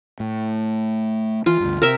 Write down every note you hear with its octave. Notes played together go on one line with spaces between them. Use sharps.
A2
E3 F4
D2 G2
C3 A#4 E5